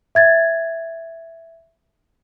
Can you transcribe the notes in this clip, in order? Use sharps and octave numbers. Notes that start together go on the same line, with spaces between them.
E5 G#6 A6